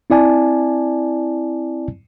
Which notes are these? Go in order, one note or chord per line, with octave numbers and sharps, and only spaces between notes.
C4 E4 D5 G#5 A5